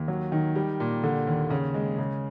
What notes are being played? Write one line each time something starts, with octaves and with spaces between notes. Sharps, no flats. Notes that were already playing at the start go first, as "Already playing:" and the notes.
Already playing: D#2
F#3
D#3
G3
A#2
D3
D#2
C#3
G#3
C#3